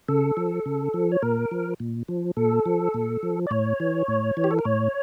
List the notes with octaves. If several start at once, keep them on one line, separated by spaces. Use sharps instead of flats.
C#3 A4
F3
C#3
F3
C#5
A#2 A#4
F3
A#2
F3
A#2 A4
F3
A#2
F3
D5
A2 C#5
E3
A2
E3
G4
A4
A#4
A2 C#5